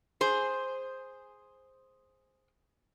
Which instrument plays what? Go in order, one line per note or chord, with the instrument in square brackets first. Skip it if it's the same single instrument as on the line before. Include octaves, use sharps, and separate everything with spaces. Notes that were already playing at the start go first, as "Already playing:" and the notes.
[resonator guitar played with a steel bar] G#4 C5